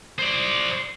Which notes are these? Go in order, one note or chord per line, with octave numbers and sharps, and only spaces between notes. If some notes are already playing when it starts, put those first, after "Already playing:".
C5 D5